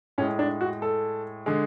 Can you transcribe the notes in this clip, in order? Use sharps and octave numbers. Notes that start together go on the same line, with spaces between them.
A2 G#3 C#4
D4
F#4
A4
D3 G#3